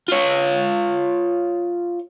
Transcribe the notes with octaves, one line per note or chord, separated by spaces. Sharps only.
F4 C#5